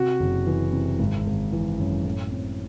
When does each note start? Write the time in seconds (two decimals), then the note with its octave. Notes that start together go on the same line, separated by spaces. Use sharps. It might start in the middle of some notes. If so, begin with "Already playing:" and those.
Already playing: C3 F#4
0.20 F#1
0.47 E3
0.73 C3
0.99 G#1
1.26 G#1
1.52 E3
1.79 F#2
2.05 A2
2.32 C4